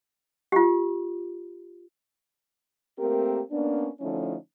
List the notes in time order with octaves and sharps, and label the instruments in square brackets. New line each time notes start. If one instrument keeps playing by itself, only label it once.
[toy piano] F4 G4
[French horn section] A3 A#3 C4 G4 A#4
A#3 B3 C#4 D4
D3 F3 A3 C#4 D#4 E4